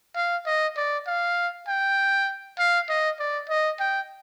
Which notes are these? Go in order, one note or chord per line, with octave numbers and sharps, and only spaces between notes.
F5
D#5
D5
F5
G5
F5
D#5
D5
D#5
G5